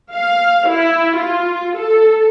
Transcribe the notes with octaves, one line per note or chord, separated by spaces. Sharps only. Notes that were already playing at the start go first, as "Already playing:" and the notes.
F5
E4
F4
A4